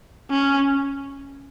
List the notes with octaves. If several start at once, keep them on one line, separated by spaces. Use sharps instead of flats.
C#4